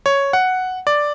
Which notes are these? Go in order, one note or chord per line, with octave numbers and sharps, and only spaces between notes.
C#5
F#5
D5